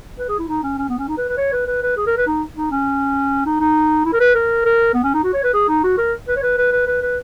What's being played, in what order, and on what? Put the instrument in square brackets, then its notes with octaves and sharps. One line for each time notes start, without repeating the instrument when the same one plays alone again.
[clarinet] B4
G#4
E4
D#4
C#4
C#4
B3
C#4
D#4
B4
B4
C#5
B4
B4
B4
G#4
A#4
B4
D#4
D#4
C#4
D#4
D#4
E4
A#4
B4
A#4
A#4
B3
C#4
D#4
F#4
C#5
B4
G#4
D#4
F#4
A#4
B4
C#5
B4
B4
B4
B4
B4